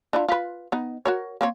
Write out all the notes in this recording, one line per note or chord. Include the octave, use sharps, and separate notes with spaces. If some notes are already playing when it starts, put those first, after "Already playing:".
D4 E4 F4
F4 B4
B3 D#4
F#4 A#4 C#5
A#3 C4 C#5